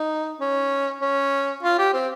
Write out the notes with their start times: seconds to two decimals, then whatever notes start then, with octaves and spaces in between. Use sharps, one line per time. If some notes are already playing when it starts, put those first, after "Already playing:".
Already playing: D#4
0.40 C#4
1.01 C#4
1.62 F4
1.78 G4
1.93 C4